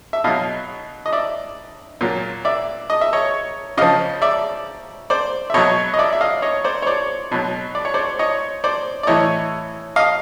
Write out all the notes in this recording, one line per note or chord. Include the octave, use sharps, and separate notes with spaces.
E5
B2 F#3 D#5 F5
D#5
D5 E5
A#2 F#3
D5 E5
D#5
E5
C#5 D#5
C#3 F3 D#5 F5
D5 E5
C5 D5
E5
B2 F#3 C#5 D#5
D#5
D5 E5
E5
D#5 F5
C#5 D#5
C5 D5
C#5
C5 D5
B2 F#3
D5
C#5
C5 D5
C#5 D#5
C5 D5
D5
A2 E3 C#5 D#5
D#5 F5